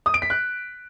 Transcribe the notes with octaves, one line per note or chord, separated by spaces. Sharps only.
D#6
D7
B6
F#6